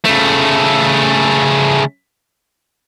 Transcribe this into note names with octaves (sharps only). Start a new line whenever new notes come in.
C#3 A3